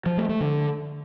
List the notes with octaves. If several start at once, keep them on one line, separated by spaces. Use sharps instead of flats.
F3
A3
A3
D3